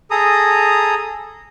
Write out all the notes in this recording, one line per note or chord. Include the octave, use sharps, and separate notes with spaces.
G#4 A4 A#5 D#6